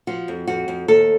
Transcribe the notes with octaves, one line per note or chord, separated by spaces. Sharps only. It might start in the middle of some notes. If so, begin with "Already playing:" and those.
F3 F#4
F2
F2 F#4
F2
D#2 A4